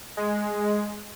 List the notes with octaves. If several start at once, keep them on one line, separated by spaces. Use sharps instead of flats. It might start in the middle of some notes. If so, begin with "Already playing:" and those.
G#3